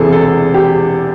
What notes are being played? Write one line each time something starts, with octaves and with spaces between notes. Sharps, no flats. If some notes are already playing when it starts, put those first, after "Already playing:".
Already playing: E1 E2 C3 E3 G#4 A4
A4
G4